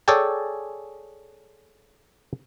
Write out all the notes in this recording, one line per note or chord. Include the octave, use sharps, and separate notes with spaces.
G#4 A4 C#5 D5 G5 G#5